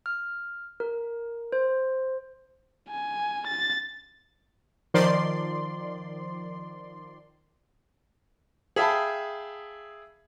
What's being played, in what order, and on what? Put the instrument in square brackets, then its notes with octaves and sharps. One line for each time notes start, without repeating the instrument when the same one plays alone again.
[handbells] F6
A#4
C5
[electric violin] G#5
A6
[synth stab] D#3 F3 D5 C6
[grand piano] G#4 E5 F5 G5 A5 B5